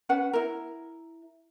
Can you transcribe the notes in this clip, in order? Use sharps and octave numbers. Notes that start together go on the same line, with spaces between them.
C#4 B4 F#5
E4 A#4